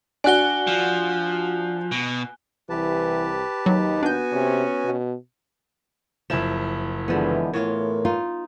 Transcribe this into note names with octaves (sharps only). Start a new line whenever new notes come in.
D4 F#4 G#5 F#6 G7
F3
B2
C2 E3 G4 B4 A5
D#2 F#3 D#4
B3 D4 F#4 G#5 G6
C3 C#4
B2
F#1 F3 E4 E7
D3 E3 F3 G#3 B3
A2 E3 F4 A#4 C#5
D#4 F4